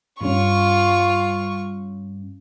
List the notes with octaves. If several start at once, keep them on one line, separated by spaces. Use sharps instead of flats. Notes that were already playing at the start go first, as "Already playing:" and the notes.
G2 G3 C#4 F4 C#6